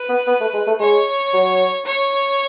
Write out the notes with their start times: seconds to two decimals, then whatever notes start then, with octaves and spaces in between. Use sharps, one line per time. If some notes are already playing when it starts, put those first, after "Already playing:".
Already playing: B4
0.09 B3
0.27 B3
0.41 A3
0.54 G#3
0.67 A3
0.80 G#3 C#5
1.33 F#3
1.86 C#5